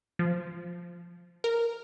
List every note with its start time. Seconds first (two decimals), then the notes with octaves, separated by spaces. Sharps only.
0.19 F3
1.44 A#4